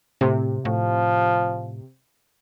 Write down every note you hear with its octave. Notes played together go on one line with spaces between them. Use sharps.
A2 C3
A2 F3